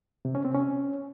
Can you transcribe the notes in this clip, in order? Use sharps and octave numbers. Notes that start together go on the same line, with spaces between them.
C3
C#4
C4
C#4